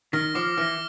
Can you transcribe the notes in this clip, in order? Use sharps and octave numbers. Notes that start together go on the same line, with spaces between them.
D#3 F6 A#6
F3 D6
E3 F6 A#6